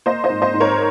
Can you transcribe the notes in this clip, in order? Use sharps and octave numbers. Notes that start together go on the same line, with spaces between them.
A#3 C5 D#5
C5 D#5
G#2
C5 D#5
G#2
A#4 C#5